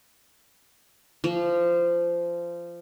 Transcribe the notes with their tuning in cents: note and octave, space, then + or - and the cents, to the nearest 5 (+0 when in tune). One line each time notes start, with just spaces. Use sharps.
F3 -20